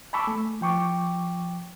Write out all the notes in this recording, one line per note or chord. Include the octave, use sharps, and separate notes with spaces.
G#5 A5 B5 C#6 D6 E6
A3
F3 G5 C#6 D6